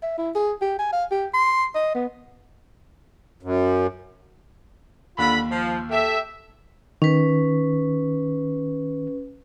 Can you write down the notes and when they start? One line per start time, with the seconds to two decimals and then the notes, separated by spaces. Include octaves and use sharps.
0.03 E5
0.18 E4
0.35 G#4
0.61 G4
0.79 G#5
0.92 F5
1.11 G4
1.34 C6
1.75 D#5
1.94 B3
3.43 F#2
5.18 D#2 D3 F4 B5
5.50 F3
5.91 G4 A4 E5
7.02 D#3 C#4 B4